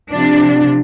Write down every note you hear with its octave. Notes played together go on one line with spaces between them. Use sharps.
C3 F3 D4